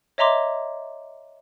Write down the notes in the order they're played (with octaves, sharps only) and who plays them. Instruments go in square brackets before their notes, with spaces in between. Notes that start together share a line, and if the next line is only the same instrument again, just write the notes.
[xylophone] C#5 D#5 E5 A#5 C6 D6